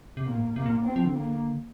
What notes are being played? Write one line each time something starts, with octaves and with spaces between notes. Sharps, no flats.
C3
A#2 A#3
A2
C3 A#3
A#2
C4
F3
D3
A#3